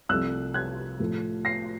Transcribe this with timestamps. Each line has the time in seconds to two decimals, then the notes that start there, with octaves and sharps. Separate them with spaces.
0.09 C2 C3 F3 A3 E6 F#6
0.54 F#6 G#6
1.00 A2 F3 A3
1.45 A#6 C7